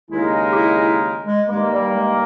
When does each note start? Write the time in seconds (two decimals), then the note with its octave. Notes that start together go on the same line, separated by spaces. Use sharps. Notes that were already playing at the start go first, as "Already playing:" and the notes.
0.11 D#2 C#3 G#3 D#4 E4 A#4
0.52 G4
0.56 E4
0.79 E4
1.26 G#3
1.48 G2 D#3 G#3 A#3
1.71 G3
1.94 G#3